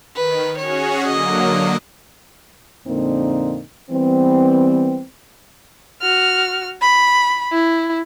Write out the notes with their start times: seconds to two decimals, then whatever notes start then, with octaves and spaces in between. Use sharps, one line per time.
0.16 D#3 B4
0.58 C#4 F#4 G#4 C#5
1.07 D3 F#3 A#3 D#5
2.87 F2 A#2 D3 A#3 C4 D#4
3.91 E3 G3 B3 C4
6.02 F#4 F6
6.81 B5
7.52 E4